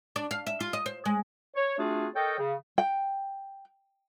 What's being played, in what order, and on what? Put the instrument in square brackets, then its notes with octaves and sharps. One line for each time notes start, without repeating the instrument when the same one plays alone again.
[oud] D4
F5
E5
F4
D#5
C5
G#3
[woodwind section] C#5
A3 C4 D4 F4 F#4 G#4
A4 A#4 C#5 D#5 G5
C#3
[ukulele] G5